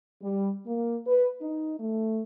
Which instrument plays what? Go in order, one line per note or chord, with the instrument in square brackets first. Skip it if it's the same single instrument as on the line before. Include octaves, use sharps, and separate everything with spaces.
[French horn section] G3
A#3
B4
D#4
A3